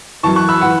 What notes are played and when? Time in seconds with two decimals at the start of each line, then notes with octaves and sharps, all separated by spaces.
0.23 F#2 E3 A5 C#6
0.36 C#6 F#6
0.49 B5 E6
0.61 E3 F#5 B5